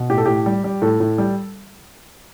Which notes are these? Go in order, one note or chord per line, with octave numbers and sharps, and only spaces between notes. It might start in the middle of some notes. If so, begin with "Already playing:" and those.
Already playing: B2
A2 G4
A4
A2 G4
G3
G3
A2 A4
A2
G3